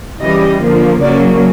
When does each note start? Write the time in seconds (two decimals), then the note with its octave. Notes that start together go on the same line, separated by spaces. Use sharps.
0.21 C#3 E3 G3 D#5
0.61 D3 F3 A#3
1.01 C#3 F#3 A#3 C#4 D5